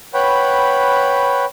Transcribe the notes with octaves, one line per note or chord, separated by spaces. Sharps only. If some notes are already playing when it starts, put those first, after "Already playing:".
B4 C#5 F#5 G5 B5